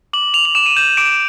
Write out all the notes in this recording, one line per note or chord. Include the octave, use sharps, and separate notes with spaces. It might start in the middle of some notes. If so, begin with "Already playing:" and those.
D6 F#7
D6 F7
F7
D6 E7
D#7
G6 E7
D6 D7